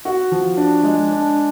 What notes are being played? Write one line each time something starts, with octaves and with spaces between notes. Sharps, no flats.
F#4
F3
D4
G#3
D4